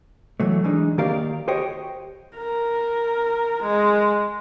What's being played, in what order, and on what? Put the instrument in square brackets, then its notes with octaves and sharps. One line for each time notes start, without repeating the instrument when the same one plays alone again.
[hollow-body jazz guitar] E3 F#3 A3
E3 G#3 D4 D#4
D#3 A#3 G4 A#4 D5 F5
F#4 G4 C5 C#5 D#5 G5
[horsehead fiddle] A#4
G#3